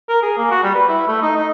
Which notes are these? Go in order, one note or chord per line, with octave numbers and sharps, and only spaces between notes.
A#4
G#4
A#3
F#4
G3
B4
E4
A3
D#4
D#4